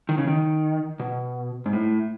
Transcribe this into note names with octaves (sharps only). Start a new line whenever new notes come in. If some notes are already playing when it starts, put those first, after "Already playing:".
D#3
C#3
D#3
B2
G#2
A2